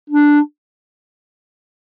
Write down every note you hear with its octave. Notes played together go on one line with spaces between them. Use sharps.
D4